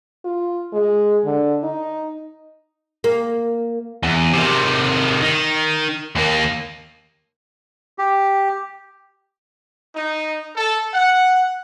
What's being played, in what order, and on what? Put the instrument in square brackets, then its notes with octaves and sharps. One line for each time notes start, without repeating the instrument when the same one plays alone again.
[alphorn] F4
G#3
D3
D#4
[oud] A#3
[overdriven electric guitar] E2
C3 D#3
D#3
D#2 A#3
[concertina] G4
[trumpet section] D#4
A4
F#5